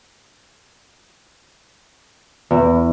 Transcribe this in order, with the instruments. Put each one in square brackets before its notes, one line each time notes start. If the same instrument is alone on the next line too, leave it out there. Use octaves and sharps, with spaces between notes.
[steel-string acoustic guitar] E2